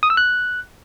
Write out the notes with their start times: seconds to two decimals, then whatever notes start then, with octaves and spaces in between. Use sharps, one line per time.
0.03 D#6
0.10 E6
0.17 F#6